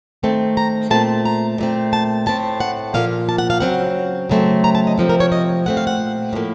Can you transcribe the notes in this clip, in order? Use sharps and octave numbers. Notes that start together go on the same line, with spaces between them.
D#3 A3 C4 A5
A#5
A#2 A3 C4 A5
A#5
A#2 A3 C4
A5
A2 A3 C4 A5
F#5
A#2 F3 A#3 F5
A5
F#5
F5
C#3 F#3 C4 F#5
C#3 F#3 A3 C4
A#5
A5
D#5
C3 F3 C4
A#4
C#5
D#5
A#2 A3 C4 F#5
F5
F#5
A2 F3 A#3